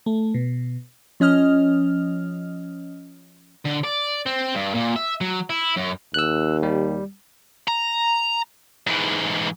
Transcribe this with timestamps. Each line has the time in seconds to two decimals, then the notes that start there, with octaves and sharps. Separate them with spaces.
0.06 A3
0.34 B2
1.20 F3 C#4 D#5 F6
3.65 D3
3.84 D5
4.26 C4
4.55 G2
4.75 A#2
4.96 E5
5.21 F#3
5.50 E4
5.77 F#2
6.14 D#2 E6 F#6
6.63 G3
7.67 A#5
8.87 G#2 E3